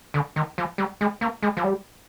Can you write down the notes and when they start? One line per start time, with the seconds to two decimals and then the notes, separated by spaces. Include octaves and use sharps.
0.14 D3
0.36 D#3
0.58 F3
0.78 G3
1.01 G#3
1.21 A#3
1.42 G#3
1.57 F3
1.64 G3